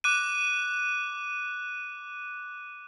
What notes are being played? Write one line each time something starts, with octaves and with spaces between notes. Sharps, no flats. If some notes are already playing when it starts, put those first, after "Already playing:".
D6 F#6 D#7